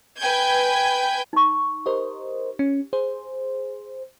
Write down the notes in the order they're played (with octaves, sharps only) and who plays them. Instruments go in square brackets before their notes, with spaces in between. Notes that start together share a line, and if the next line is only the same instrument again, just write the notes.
[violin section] B4 G5 G#5 G6 G#6
[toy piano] D#4 C#6
[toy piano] G4 [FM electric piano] A#4 C5 D#5
[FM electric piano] C#4
G#4 C5